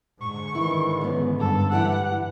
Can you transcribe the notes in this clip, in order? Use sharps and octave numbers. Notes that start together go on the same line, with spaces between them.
G#2 D3 C#6
D#3 E3 E4
F#2 B3
G2 A4
E3 G3 E4 G4 F#5